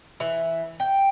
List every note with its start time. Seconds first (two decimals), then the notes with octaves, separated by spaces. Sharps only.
0.20 E3
0.80 G5